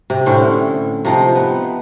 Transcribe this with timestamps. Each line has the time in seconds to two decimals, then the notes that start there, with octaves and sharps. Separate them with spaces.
0.10 C3
0.26 A2 D3 C4 C#4
1.05 C3 F3 D#4
1.35 B3